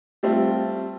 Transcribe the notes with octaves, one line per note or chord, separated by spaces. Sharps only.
G3 A3 C4 F4